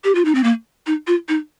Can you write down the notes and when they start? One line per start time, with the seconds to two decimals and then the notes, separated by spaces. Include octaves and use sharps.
0.04 G4
0.15 F4
0.25 D#4
0.35 C4
0.44 A#3
0.87 D#4
1.07 F4
1.29 D#4